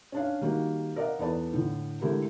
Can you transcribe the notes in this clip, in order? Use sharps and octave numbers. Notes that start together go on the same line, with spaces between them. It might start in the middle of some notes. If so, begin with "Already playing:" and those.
C#4 D4 F5
D#3 G3 A#3 F#4
A#4 D5 D#5 F5 F#5
E2 B3 A4 B4 D5 A5
A2 D3
D3 G#3 A3 E4 G4 A#4